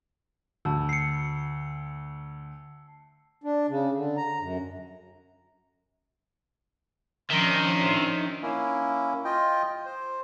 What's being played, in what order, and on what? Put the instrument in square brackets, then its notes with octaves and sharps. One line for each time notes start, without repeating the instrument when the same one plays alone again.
[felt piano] D2 [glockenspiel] A5 E6
[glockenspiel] C7 C#7
[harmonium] D4
C#3
D3
A#5
F#2
[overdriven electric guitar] D#3 [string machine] F3 C#4 D4 [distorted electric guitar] E5 A#5 [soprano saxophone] C6
[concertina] A#3 C#4 E4
F4 D#5 G5
C5